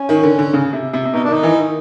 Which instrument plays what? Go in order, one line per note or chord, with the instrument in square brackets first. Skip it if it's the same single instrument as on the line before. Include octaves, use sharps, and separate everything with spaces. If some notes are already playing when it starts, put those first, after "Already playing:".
Already playing: [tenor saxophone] C#4
[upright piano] D#3
D3
D3
C#3
C3
C3
C3
[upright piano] B2 [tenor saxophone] D#4
[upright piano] D#3 [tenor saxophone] D4
[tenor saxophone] D#4
[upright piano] E3
D#3